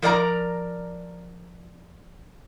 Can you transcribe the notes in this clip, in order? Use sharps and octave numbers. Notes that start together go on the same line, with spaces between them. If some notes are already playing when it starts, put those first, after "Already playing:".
F3 A#4 D5 F5 A#5